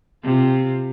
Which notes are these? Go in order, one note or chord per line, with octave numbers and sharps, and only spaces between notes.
C3 F4